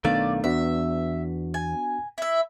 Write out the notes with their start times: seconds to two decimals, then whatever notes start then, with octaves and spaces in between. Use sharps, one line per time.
0.05 B1 D#3 A3 B3 D4 D5 F5
0.44 E2 B3 D4 F#4 E5
1.54 G#5
2.18 E4 E5